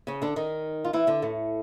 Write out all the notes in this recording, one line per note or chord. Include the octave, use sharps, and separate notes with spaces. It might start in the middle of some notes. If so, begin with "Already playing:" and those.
C#3 C#4
D3 D4
D#3 D#4
F4
E3 E4
D3 D4
A2 A3